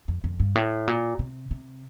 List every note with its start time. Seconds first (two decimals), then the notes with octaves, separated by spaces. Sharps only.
0.08 F2
0.24 F2
0.40 G2
0.55 A2
0.87 A#2
1.19 C3
1.51 C3